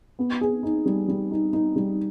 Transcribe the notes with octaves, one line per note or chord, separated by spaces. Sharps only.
B3
G#4
D#4
G3
G3
D#4
D#4
G3